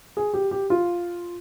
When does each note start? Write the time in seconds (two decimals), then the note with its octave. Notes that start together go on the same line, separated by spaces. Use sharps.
0.17 G#4
0.34 G4
0.51 G4
0.70 F4